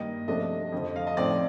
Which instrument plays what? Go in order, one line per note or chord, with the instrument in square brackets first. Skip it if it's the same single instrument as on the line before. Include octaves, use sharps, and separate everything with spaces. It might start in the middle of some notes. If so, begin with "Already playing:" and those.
Already playing: [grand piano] G2 D#3 A#3 [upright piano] D#5
[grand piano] C3 F3 A3 D4 [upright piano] D#5
[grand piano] F2 D3 F3
[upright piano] F5
D#5
[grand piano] A2 F3 C4 D#4 [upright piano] D5